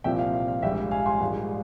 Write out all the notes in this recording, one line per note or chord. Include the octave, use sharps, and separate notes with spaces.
C2 A#2 F3 E5 G5
F5
F5
F5
A#1 G#2 G3 E5 G5
F5 G#5
G#5 C6
A#1 G#2 G3